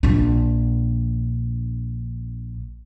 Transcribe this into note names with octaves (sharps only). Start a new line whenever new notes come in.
A#1 D4